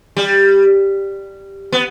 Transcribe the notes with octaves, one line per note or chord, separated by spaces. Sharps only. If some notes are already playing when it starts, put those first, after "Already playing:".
G3
B3